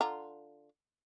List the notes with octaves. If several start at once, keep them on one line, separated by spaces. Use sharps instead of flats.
D3 F4 A#5